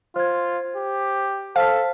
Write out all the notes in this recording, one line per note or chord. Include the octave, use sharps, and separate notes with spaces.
F4 C5 G#6
G4
A4 C5 F5 A5 B6